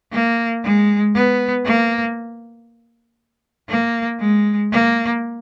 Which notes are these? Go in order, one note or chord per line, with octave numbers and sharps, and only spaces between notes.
A#3
G#3
B3
A#3
A#3
G#3
A#3